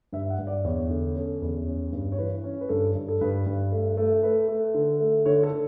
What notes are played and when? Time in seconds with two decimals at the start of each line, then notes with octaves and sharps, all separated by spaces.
0.12 G2 E5
0.30 F#5
0.39 G2
0.47 D5
0.64 E2 C#5
0.90 D3
1.15 C#4 A4
1.42 E2
1.67 C#4
1.93 G2
2.12 C#5
2.18 E3 B4
2.44 C#4
2.61 B4
2.69 G2 A4
2.95 G2
3.08 A4
3.21 G2 B4
3.46 G2
3.72 A3
3.97 A3
4.23 A3 B4
4.48 A3
4.74 D3
5.00 A3
5.26 D3 C#5
5.43 A4
5.51 D3